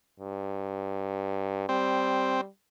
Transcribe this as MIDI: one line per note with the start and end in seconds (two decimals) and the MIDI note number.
0.20 1.69 43
1.69 2.47 55
1.69 2.41 60